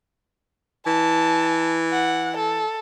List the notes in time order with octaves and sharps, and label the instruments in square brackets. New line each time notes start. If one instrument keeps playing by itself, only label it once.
[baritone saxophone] E3 [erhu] A5
[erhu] F#5
A4